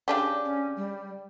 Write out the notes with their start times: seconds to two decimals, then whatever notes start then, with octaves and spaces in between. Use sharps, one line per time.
0.08 C#3 D4 G4
0.45 C#4
0.77 G3